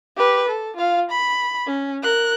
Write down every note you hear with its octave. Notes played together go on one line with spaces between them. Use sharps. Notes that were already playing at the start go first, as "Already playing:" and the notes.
G4 B4
A4
F4 F5
B5
C#4
A#4 F#6